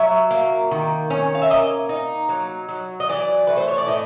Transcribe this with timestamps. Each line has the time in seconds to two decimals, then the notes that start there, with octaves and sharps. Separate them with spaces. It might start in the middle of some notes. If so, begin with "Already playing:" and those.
Already playing: F#3 E5
0.31 A#3
0.71 D#3
1.10 C#4
1.35 F5
1.42 E5
1.50 A#3 D#5
1.89 D#4
2.29 F#3
2.69 F#3
3.00 D#5
3.09 E3 D5
3.47 A3 B4
3.57 C5
3.68 C#5
3.78 D5
3.88 A2 D#5